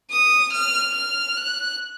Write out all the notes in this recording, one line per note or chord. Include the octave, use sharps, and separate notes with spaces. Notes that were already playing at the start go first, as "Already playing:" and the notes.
D#6
F6
F6
F#6